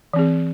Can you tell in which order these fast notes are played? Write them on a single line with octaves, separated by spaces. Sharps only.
E3 C4 G#4